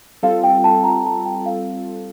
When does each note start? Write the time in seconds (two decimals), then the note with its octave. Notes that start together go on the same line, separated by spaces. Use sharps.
0.23 G3 C4 F4 A4 F5
0.44 G5
0.64 A5
0.84 A#5
1.05 A5
1.26 G5
1.46 F5